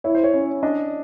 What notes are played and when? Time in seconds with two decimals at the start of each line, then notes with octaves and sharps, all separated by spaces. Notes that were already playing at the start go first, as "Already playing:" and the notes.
0.04 E4 C#5
0.15 C5
0.24 C#5
0.34 C#4
0.63 D4 D#5